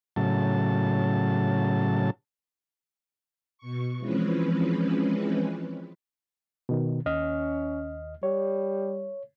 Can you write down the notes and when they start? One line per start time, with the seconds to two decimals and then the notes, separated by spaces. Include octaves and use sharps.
0.16 A2 C#3 F#3 A5
3.58 B2 C#6
3.98 E3 F3 G#3 C4 C#4 B4
6.69 B2 D#3
7.06 D#2 C#4 D#5 F6
8.23 G3 C#5